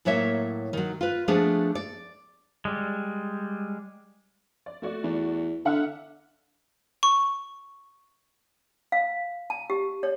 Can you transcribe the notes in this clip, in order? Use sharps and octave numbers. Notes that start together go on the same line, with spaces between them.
A2 F#3 A#3 C#5 E5
D#3 F#3
F4 B4
F3 A3 B3 D4 G#4
D5
G3 G#3
D5
A3 F#4 D5
E2
D3 E5 F#5 F6
C#6
F5
A5
G4
C#5